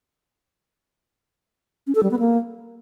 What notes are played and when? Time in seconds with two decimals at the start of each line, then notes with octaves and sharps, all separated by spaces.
1.87 C#4
1.95 A4
2.03 G3
2.11 B3
2.19 A#3